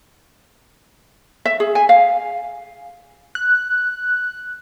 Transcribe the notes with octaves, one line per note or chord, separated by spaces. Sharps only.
E5
G#4
G#5
F5
F#6